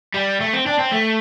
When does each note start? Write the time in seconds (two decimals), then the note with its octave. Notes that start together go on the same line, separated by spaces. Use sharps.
0.14 G3
0.40 A3
0.53 C4
0.66 D4
0.79 C4
0.92 A3